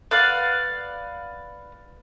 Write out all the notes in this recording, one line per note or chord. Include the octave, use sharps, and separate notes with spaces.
B4 D5 F5 F#5